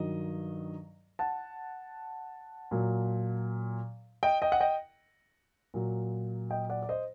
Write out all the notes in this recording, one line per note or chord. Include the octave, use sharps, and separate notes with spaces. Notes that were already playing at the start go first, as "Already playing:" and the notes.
Already playing: G2 D#3 F#3 D#5
F#5 A5
A#2 F#3
D#5 G5
D#5 G5
F#5
D#5 G5
A#2 F#3
D#5 G5
D5 F#5
D5
C5 D#5